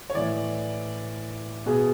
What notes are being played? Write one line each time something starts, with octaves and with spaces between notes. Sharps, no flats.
C#5
A2 E3 D5
B2 G#4